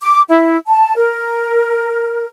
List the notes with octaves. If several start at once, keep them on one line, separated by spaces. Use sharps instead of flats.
D6
E4
A5
A#4